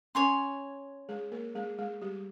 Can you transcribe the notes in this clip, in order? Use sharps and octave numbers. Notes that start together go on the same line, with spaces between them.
C#4 C#5 G#5 C6
G#3 G#4
A#3 A#4
G#3 G#4
G#3 G#4
G3 G4